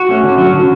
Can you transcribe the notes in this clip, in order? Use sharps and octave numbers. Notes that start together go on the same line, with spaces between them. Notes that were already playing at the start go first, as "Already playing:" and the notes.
Already playing: F#4
A3 C#4
D3
F#3 C#4
D3